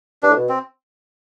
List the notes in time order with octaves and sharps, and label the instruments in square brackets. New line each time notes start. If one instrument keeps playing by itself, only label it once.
[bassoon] G2 [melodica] D4
[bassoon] A2
B2
[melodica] C4